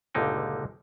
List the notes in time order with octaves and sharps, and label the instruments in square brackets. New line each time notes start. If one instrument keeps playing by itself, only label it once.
[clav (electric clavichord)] G1 C#2 A#2 D3 D#4 G5